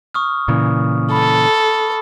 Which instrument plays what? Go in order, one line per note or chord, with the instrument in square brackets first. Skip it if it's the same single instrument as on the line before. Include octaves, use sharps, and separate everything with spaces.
[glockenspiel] C#6 D#6 F6
[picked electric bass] A#2 C#3 E3
[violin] A4 [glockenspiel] B5